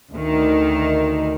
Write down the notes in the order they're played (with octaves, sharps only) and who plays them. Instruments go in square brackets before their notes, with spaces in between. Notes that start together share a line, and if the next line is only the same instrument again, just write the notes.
[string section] D2 D#3